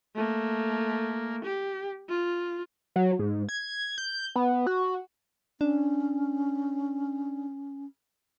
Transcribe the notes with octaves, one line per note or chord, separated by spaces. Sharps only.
A3 A#3
G4
F4
F#3
G#2
G#6
G6
B3
F#4
C#4 D4